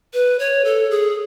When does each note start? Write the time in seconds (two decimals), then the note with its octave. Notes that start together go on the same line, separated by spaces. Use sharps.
0.14 B4
0.39 C#5
0.65 A4
0.91 G#4